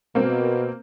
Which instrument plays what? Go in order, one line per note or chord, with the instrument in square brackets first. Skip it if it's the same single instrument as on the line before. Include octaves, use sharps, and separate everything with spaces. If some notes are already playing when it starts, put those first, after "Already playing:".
[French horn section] B2 [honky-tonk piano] A#3 C4